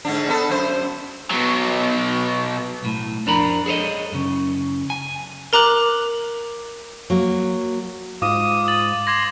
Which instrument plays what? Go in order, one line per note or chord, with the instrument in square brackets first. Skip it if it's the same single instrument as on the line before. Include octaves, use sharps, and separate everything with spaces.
[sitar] G#2 D3 D4
B3 A4
F#2 C5
[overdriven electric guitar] B2 F#3
[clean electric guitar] B1 A2
F2 D4 A#4 B5
G#4 A4 C5 C#5 D#5
F#2 C#3
G#5
[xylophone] A#4 A#5 D6 F#6 F#7
[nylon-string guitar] F#3 A#3
[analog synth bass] G#2 [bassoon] F4 [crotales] D6 [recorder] D#6
[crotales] A6 F#7
[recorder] C6 [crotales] D6 G#6 A#6